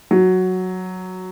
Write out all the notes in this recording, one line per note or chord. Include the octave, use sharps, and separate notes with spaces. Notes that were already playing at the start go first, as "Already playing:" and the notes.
F#3